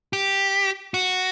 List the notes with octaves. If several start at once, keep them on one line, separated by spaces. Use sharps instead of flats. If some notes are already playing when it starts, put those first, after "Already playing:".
G4
F#4